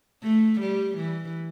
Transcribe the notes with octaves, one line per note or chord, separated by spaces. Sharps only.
A3
G3
E3